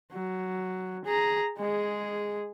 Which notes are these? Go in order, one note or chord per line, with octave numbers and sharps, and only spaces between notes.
F#3
G#4 A#5
G#3 G#4